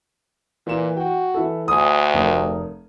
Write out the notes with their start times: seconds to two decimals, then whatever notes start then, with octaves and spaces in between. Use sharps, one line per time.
0.67 A#2 E3 E7
0.97 F#4 G5
1.34 E3 E4 A4
1.68 D2 G#5 D#6
2.14 F1 A#4 D#6